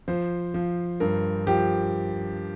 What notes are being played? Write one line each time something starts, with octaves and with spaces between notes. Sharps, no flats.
F3 C5
F3
G2 A#4
F3 G4